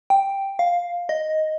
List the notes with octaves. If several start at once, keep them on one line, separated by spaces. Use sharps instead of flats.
G5
F5
D#5